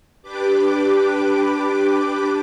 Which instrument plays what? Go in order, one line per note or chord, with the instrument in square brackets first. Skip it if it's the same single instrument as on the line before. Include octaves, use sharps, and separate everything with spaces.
[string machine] D4 G4 B4 D6